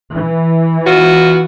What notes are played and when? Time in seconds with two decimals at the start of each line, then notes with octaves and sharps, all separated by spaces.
0.14 E3
0.86 B3 F4 F#4